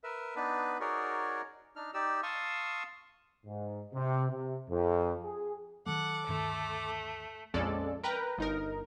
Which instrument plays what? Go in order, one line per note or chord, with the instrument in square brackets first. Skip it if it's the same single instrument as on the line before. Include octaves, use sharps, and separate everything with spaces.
[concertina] A#4 B4 E5
B3 D4 D#4 B4
D#4 F#4 G#4 A#4 C#5 D5
D4 D#4 F6
D#4 G4 D5 E6
F5 A5 C6 C#6 D#6 E6
[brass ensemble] G#2
C3
C3
F2
G#4
[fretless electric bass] D#3 F#3 A3 [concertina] A4 D6 [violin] F#5
[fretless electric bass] D2 G2 D#3 [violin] A3
[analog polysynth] A#1 F2 G#3 C#4 A4 D5
A#4 B4 G5 A#5
G1 D#4 A#4